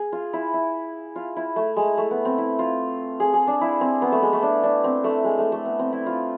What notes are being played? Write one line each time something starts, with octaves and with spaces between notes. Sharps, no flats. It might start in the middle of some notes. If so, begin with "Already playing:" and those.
Already playing: G#4
F4
E4
E4
F4
E4
A3
G#3
A3
B3
C4
E4
F4
G#4
G#4
D4
E4
C4
B3
A3
G#3
A3
D4
D4
C4
A3
G#3
A3
A3
B3
C4
E4
F4